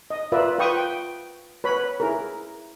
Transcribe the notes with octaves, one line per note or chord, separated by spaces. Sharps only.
D#5
F4 A#4 B4 D5 E5
F4 B4 G5 C#6 D#6
G5
B4 C#5 B5
E4 G#4 A#4